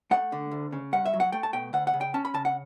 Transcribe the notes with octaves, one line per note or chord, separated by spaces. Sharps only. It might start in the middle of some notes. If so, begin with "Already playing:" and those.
A3 F#5
D3
D2
C#3
G2 F#5
E5
F#3
F#5
A3 G5
A5
B2 G5
D2 F#5
F#5
C#3
G5
C#4 A5
B5
C#3 A5
F#5